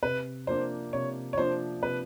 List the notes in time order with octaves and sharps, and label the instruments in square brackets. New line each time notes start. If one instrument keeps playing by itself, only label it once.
[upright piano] C3 [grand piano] B4
[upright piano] F3 A#3 D4 [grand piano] C5
[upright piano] C3 [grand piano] C#5
[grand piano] C#5
[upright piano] F3 A#3 D4 [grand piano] C5
[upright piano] C3 [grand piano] B4